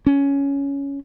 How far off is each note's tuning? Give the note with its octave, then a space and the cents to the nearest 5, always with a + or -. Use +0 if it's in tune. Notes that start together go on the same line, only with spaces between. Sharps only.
C#4 +10